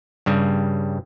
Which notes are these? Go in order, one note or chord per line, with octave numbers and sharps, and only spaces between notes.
G2 C#3 G3